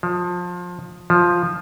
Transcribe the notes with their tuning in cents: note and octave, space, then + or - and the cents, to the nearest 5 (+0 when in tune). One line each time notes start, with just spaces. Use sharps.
F3 +25
F3 +5